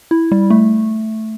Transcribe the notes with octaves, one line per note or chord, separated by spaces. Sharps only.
E4
G3
A3